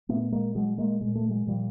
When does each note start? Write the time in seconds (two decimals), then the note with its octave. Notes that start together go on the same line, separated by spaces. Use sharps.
0.09 A#2 A3 B3
0.32 G#3 A#3
0.55 A#2 F#3 G#3
0.78 G#3 A#3
1.01 A#2 G#3
1.15 A3
1.29 F#3 G#3
1.47 A#2 F3 G3